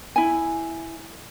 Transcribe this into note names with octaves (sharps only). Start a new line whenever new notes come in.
E4 G#5